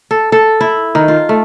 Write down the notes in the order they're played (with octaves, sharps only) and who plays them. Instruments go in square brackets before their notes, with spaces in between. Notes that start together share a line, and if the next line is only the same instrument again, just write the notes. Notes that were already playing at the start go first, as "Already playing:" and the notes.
[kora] A4
A4
E4
D#3
F4
A3